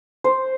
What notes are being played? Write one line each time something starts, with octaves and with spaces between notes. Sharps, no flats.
C5